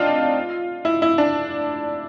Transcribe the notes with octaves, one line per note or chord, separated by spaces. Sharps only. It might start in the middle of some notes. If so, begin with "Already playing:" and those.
Already playing: C4 D4 D#4 F4
E4
E4
D4